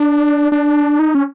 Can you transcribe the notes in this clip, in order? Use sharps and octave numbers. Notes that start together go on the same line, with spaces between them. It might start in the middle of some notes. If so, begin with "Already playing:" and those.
Already playing: D4
D4
D#4
C#4